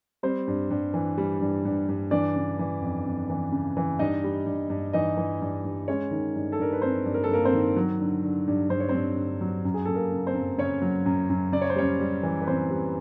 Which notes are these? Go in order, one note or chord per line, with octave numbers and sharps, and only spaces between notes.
G3 C4 C5
G2
G2
E3
G3
G2
G2
G2
E3 D4 D5
C#3
E3
F2
F2
E3
C#3
E3
G2 D#4 D#5
G3
G2
G2
E3 D#4 D#5
E3
G2
G2
G#3 C#4 C#5
D#3
G2
A4
G2 A#4
B4
G2 C4 C5
G2
A#4
A4
G2 A#3 A#4
C4 C5
D#3
F#3
D3
D3
G2
G2 C5
C#5
C4 C5
G2
D3
F#3
F#2
G#4
F#2 A4
A#3 A#4
C#3
C4 C5
F#2
C#3 C#4 C#5
F#3
F#2
F#2
C#3 D5
C#5
C5
G3 C#4 C#5
G3
E3
B4
E3 C4 C5
G3